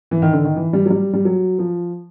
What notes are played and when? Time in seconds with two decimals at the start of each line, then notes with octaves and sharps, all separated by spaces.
0.11 E3
0.22 D#3
0.33 D3
0.44 D#3
0.56 E3
0.73 G3
0.86 F#3
0.90 G3
1.13 G3
1.25 F#3
1.59 F3